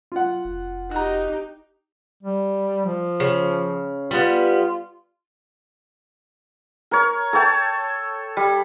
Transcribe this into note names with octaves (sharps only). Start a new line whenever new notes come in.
F4 F#5
F1
D#4 F#4 G4 A#5
G3
F3
C#3
G3 B3 F4
A#4 C#5
A4 C#5 G5 A5
G3